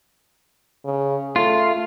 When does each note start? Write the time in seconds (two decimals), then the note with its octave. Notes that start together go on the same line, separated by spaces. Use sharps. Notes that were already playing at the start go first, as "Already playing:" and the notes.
0.85 C#3
1.36 A3 F4